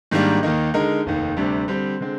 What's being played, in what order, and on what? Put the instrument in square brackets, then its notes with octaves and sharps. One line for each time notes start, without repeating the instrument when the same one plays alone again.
[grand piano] G#2 D#3 G3 A#3 D4
D#2 D#3 A#3 D#4
D3 G#3 D#4 A#4
F1 D#2 D#3
D2 C3 G3 D4
D3 G3 C4
D3 G#3 C4